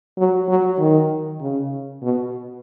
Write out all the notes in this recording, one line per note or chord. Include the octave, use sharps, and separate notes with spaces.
F#3
F#3
D#3
C#3
B2